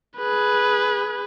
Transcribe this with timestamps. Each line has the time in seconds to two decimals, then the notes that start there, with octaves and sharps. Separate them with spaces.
0.18 G#4 B4